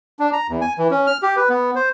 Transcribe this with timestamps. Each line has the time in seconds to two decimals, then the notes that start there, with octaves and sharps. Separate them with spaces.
0.19 D4
0.33 A#5
0.49 E2
0.61 G#5
0.78 E3
0.91 C#4
1.07 F6
1.22 G4
1.36 B4
1.49 B3
1.75 C5